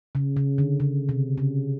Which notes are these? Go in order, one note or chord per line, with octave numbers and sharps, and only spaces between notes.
C#3
C#3
D3
C#3
C3
C#3